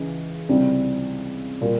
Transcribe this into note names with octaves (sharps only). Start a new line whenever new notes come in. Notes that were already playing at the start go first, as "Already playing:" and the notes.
Already playing: C#2 C#3 E3 G#3
C#2 C3 G3 C4 E4
A#2 G3 A#3 F4